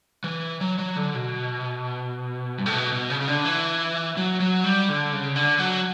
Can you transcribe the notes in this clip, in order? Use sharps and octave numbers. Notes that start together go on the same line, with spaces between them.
E3
F#3
F#3
D3
B2
G2
A2
B2
B2
C#3
C#3
D3
E3
F#3
F#3
G3
D3
C#3
D3
F#3